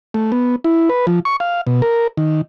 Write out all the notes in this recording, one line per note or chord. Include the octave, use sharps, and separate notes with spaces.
A3
B3
E4
B4
F3
C#6
F5
B2
A#4
D#3